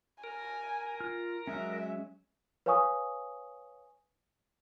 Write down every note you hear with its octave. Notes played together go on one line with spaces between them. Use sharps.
A#4 G#5
F4 F6
F#3 G#3 C#4 E5
B4 C#5 F5 G#5 C#6 D#6